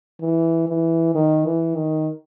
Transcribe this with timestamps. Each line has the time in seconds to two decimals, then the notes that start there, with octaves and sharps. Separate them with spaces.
0.21 E3
0.68 E3
1.15 D#3
1.46 E3
1.76 D#3